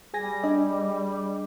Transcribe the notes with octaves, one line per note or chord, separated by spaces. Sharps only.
G3 G#4 G#5 A#6
D4 G#4 D#5